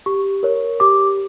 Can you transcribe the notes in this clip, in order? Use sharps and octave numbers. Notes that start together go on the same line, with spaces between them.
G4 C#6
A#4 C#5
G4 D6